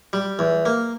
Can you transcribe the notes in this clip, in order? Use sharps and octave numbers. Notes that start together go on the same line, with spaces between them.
G3
E2
A#3